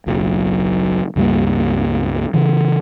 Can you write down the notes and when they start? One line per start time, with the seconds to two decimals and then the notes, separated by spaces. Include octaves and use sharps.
0.06 F#1 B1 F#2 F#3
1.16 C#2 G2 G3 A#3
2.34 C#3 E3